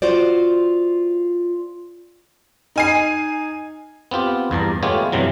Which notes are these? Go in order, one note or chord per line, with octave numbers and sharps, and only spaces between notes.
F4 F#4 C5 D5
D#4 G#5 C7
B3 C4 F4 G4
E2 G2 A5 A#5
G#3 A3 B3 F4 G4 C#5
G2 C3 E3 F#3